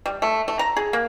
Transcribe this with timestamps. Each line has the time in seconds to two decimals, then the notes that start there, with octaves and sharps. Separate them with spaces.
0.06 G3
0.22 A3
0.48 A3
0.59 A#5
0.77 G#4
0.93 A#3